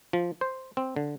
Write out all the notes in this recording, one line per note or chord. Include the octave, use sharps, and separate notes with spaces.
F3
C5
C4
D3